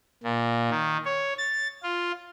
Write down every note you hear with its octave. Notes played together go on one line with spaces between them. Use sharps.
A#2
D#3
C#5
A6
F4